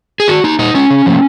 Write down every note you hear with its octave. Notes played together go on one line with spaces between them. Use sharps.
G#4
D#3 F#4
A#3 D#4
A#2 D#4
G#3 C#4
C#3
F3 A#3